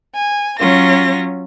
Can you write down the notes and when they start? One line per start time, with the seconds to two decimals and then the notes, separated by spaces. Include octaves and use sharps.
0.15 G#5
0.59 F#3 C#4 F4 A#6